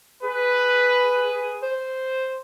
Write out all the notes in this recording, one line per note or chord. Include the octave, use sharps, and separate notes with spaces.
G#4 B4
C5